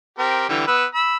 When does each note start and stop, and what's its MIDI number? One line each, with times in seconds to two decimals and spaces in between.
0.19 0.47 60
0.19 0.47 67
0.19 0.47 70
0.49 0.67 50
0.49 0.67 52
0.49 0.67 55
0.67 0.85 59
0.67 0.85 71
0.67 0.85 88
0.94 1.17 83
0.94 1.17 88